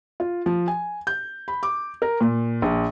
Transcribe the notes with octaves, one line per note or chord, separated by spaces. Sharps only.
F4
F3
G#5
G6
B5
D6
A#4
A#2
A#1